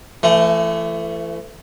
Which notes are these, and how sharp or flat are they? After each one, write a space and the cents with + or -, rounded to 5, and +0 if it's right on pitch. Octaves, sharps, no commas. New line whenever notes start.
E3 +45 A3 +15